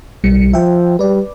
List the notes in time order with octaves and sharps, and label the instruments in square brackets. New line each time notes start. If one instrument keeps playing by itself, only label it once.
[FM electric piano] B1 G3 C#7
[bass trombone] F3 [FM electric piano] E5 G5
[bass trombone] G3 [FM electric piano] B4 D5